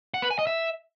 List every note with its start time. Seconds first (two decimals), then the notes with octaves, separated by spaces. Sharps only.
0.14 F#5
0.22 B4
0.30 G#5
0.39 D#5
0.47 E5